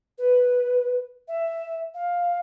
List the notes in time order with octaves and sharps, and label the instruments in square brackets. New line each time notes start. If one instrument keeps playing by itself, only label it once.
[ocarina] B4
E5
F5